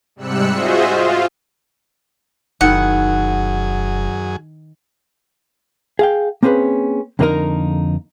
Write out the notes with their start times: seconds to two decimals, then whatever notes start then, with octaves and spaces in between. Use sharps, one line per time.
0.16 G#2 C3 G3 E6 F#6 C#7
0.51 F4 F#4 G#4 C5 D#5 E5
0.91 F4
2.61 F1 F#2 D#3 E4 G#4 F#5
5.99 G#4 F5 G5
6.43 A#3 C4 C#4 G#4 B4
7.19 F2 D3 A#3 C#4 D#4 A#4